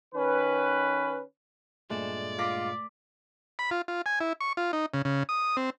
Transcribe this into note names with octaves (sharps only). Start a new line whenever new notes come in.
D#3 C#4 B4
G2 A#2 G#3 A3 D5 E7
F4 D6 A#6 B6
B5
F4
F4
G#5
E4
C#6
F4
D#4
C#3
C#3
D#6
C4